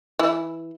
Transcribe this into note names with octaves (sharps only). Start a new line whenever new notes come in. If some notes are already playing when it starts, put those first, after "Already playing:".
E3 E4